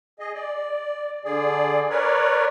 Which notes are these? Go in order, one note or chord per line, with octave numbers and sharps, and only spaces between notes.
G#4 D#5
D5
D3 G#4 D5
A#4 B4 C#5 D5